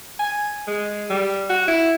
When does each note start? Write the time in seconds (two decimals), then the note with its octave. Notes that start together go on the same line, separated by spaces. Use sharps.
0.19 G#5
0.67 G#3
1.10 G3
1.50 F#4
1.68 E4